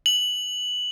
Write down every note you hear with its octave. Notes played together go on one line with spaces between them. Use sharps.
F#7